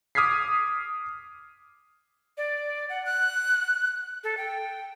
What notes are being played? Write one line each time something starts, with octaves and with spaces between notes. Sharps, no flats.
D6 D#6 F6 G#6 B6 C7
D5
F#5
F#6
A4
G5